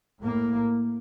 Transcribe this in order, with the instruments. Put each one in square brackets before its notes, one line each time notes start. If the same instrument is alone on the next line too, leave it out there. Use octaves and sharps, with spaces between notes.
[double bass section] A2 A#3